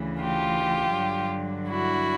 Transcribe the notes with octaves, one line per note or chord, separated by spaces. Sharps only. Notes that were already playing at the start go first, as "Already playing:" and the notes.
Already playing: D2 C#3 E3
F4 G4
G2 D3 F#3
E4 F#4